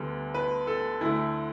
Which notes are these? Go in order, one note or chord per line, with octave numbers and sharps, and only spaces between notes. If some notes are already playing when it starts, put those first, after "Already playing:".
Already playing: D2 D3 G3 B3
B4
A4
D2 D3 A3 E4